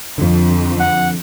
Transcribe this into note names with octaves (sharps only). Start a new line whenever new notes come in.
F2 D3 F3
F#5